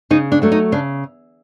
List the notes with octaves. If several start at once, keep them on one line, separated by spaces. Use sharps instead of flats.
C#3 D#4
D4
F#3 A3 D4
D#4
C#3 D4